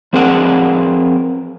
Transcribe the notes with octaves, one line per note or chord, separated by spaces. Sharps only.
F3 C4 G#4 A#4 E5 F#5